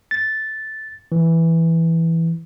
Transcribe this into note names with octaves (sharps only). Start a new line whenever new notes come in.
A6
E3